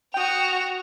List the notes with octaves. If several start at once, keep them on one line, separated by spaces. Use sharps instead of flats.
F#4 G5 D#6 F7